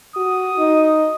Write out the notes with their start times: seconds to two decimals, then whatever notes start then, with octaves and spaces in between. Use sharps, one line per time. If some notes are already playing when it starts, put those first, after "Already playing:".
0.16 F#4 D#6
0.59 D#4